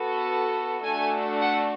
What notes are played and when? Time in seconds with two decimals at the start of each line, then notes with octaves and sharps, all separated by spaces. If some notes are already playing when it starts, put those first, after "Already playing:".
Already playing: B3 F#4 A4
0.84 A3 D4 F#4 A4 G#5
1.41 F#5